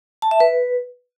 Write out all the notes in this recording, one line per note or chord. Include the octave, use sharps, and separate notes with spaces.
A5
E5
B4